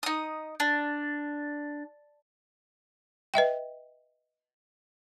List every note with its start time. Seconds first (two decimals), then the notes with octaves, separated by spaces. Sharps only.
0.03 D#4 D#6
0.60 D4
3.34 B4 D#5 E5 G5